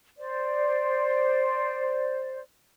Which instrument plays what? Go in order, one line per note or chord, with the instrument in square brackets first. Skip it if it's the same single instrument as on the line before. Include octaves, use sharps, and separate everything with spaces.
[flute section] C5 D5